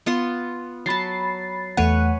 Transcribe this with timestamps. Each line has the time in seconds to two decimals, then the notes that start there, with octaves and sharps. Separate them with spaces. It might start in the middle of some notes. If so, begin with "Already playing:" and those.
0.06 B3 F4 C6
0.86 F#3 A5 B5 A6 C7
1.77 E2 A3 B4 C#5 F#5 G#5